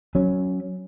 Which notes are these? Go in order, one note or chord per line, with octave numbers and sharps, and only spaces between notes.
F#3 C#4